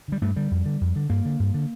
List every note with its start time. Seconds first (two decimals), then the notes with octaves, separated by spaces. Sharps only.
0.08 D3 G3
0.22 G2 A3
0.36 D3 G3
0.51 F2
0.66 D3
0.81 F2
0.96 D3
1.09 G2 A#3
1.25 D3
1.40 G2
1.54 D3